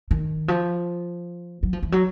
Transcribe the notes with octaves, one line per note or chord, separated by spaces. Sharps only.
D#3
F3
F#3
F3
E3
F#3